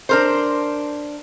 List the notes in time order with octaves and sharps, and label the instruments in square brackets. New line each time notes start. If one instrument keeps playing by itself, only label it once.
[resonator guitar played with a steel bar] D4 A#4 C5